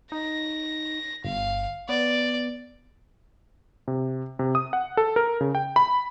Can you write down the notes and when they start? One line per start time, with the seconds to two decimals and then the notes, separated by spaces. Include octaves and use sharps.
0.12 D#4 A#6
1.25 G1 F5
1.89 B3 D5
3.88 C3
4.39 C3
4.55 D#6
4.73 F#5
4.97 A4
5.16 A#4
5.41 C#3
5.55 G5
5.76 B5